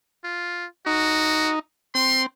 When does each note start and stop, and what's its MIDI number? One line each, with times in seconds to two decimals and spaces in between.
0.24 0.66 65
0.86 1.59 63
0.86 1.53 66
1.95 2.26 60
1.95 2.22 84